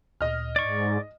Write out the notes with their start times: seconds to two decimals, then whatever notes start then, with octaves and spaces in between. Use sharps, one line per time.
0.21 D2 A#2 D#5 F6
0.56 G#2 D5 C#6 G#6